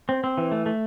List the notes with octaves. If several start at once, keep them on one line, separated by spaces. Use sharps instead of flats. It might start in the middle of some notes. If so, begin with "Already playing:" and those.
C4
C4
E3
A3
A3